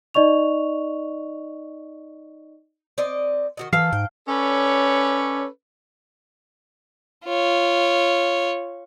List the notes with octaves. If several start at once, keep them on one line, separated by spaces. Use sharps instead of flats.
D#4 D5 D#5 C#6 F7
C4 D5 D#5
D#3 F#4 D#5
D#3 E3 A4 F5
G#2 G5
C#4 A4 B4 C#5 D5
F4 C#5